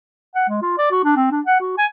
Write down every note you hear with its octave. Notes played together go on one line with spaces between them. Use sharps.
F#5
G#3
F4
D5
F#4
D4
C4
D4
F#5
F#4
G#5